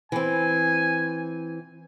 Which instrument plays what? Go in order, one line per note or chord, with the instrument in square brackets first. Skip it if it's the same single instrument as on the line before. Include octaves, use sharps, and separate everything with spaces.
[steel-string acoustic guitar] E3 C4 [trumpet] G#5